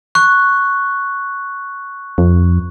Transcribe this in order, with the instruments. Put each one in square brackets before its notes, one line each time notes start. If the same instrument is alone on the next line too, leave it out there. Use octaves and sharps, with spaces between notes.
[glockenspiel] C#6 F#6
[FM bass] F2